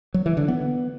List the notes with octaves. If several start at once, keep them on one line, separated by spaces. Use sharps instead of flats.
F#3
E3
D3
B3